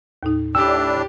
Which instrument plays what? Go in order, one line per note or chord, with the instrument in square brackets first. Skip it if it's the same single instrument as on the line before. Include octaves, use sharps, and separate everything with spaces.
[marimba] D#2 A2 D#4
[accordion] A2 D4 [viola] G4 [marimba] G5 [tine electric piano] E6